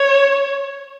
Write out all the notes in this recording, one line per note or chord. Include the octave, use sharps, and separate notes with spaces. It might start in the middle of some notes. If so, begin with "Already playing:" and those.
Already playing: C#5